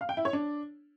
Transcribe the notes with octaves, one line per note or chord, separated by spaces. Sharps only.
F5
G5
E4
C#5
D4